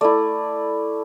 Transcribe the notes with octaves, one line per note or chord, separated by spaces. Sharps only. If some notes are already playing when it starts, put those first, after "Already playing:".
A3 E4 D5